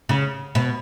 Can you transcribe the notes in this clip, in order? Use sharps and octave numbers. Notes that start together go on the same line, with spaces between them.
C#3
B2